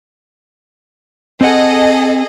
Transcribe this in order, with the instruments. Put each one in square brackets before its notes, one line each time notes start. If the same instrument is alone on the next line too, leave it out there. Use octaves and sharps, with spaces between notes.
[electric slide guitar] C4 F#5 [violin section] G#4 A4 D#5